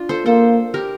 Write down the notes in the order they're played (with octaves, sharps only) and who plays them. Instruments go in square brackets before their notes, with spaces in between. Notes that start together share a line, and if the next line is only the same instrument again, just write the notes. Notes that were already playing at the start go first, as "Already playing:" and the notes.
Already playing: [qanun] D4 F4
A4 C5
[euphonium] A#3 [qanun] A4 C5
[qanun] G4 A#4